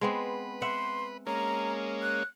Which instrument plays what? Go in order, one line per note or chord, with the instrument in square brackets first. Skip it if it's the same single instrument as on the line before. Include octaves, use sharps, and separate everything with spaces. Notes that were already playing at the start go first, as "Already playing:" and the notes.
[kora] G#3 B3 C4 [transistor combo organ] B4
[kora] E5 F#5 [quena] C6
[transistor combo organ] G#3 A#3 C#4 [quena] A#5
[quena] F#6